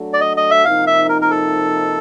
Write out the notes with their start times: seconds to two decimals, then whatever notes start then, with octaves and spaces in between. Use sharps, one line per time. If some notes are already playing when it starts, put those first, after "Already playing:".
Already playing: F#3 A3 D4 F#4 A4
0.13 D5
0.20 D#5
0.37 D#5
0.51 E5
0.65 C3 F3 A#3 D#4 F5
0.87 E5
1.09 A#4
1.22 A#4
1.31 A4